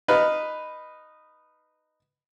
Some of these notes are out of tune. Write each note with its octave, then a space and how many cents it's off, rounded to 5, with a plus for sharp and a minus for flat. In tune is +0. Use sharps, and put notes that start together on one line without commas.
D#4 -10 B4 +0 F5 +0